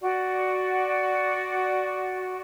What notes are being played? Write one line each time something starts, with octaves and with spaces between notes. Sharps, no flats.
F#4 D5